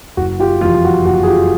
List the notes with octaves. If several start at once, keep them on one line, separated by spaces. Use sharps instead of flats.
F#1 F#4
F4 G4
F2 C3 E3 G3 F4
F#4
F#1 F#4
G#4
F4 G4